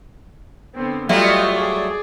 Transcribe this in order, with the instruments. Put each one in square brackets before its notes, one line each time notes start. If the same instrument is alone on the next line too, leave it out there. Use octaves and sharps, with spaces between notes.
[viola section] D3 B3 C4
[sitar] F#3 G3 A3 [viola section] F4 C#5 D#5
[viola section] G#4 D5